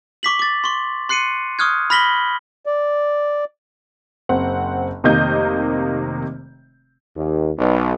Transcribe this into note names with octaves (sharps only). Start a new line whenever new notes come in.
C#6 D6 B6 F#7
D6 A6
C6 C#6
C6 F#6 C7 C#7 D#7
C#6 D#6 F6 F#6 G#6
B5 F6 A#6 B6 F#7 G7
D5
F#1 C4 F#5
F1 C3 D#3 A#3 D#5 G6
D#2
B1